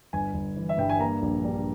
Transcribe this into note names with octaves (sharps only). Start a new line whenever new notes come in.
G1 G#5
G1
E3
E5
G2 G5
G#5
A#3 A#5
A#1
G3